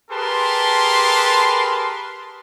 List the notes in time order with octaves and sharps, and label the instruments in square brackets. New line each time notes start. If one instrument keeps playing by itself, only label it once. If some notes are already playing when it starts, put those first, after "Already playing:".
[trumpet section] G4 G#4 A#4 B4 A5 C6